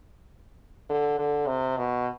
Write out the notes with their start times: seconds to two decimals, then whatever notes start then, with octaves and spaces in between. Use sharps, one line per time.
0.90 D3
1.19 D3
1.47 C3
1.77 B2